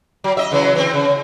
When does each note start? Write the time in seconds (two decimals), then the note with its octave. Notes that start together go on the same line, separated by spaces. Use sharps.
0.24 F#3
0.37 D#5 E5
0.51 C#3 E3 F#3
0.75 E3 C4
0.94 C#3